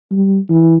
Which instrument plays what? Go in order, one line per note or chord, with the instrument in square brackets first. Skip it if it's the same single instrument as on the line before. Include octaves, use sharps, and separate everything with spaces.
[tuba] G3
E3